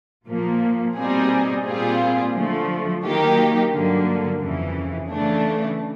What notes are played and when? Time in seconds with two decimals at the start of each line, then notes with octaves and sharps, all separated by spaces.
0.26 A#2 F3 A#3
0.96 B2 G3 C4 D#4 G#4
1.64 A#2 G3 C4 F4 G#4
2.33 D3 F3 A3
3.03 D#3 F#3 A#3 D#4 G4
3.72 G2 D3 F#3 A#3
4.41 F2 C#3 E3
5.10 C#3 E3 A3 D4